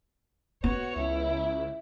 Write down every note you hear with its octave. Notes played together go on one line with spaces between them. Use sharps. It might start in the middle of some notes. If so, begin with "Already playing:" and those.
B3 F#4 C#5
C#2 E4